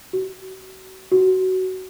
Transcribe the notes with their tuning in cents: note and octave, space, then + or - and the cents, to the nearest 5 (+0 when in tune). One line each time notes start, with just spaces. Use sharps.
F#4 +35
F#4 +15